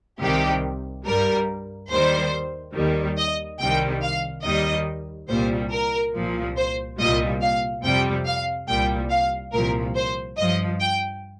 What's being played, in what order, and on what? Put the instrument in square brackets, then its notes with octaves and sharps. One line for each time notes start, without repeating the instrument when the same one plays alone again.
[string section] C2 C3 D#3 G3 G4
G2 G3 A#4
D#2 D#3 G3 C5
D#2 D#3 G3
D#5
C2 C3 D#3 G3 G5
F5
D#2 D#3 G3 D#5
C2 A#2 G3 C5
A#4
C2 A#2 F3
C5
C2 A#2 G3 D#5
F5
F2 C3 G3 G5
F5
C2 A#2 G3 G5
F5
C2 A#2 F3 A#4
C5
G2 F3 D#5
G5